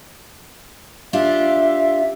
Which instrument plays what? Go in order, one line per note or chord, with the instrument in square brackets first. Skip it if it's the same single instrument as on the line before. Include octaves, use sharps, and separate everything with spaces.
[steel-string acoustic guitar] D4 F4 G4 [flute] E5